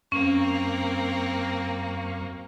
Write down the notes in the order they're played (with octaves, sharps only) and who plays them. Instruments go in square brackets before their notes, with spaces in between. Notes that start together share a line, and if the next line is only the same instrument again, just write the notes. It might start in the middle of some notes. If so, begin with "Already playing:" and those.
[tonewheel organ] F#2 F5 C#6 [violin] A#3 C4 [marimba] C#4